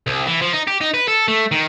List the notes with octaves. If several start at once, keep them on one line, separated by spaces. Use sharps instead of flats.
C2
E3
F3
D#4
G4
D#4
B4
A4
A3
D#3